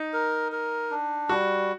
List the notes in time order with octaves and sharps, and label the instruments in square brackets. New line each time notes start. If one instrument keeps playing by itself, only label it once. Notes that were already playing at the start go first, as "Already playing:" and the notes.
Already playing: [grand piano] D#4
[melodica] A#4
A#4
D4
[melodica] G3 [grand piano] F#4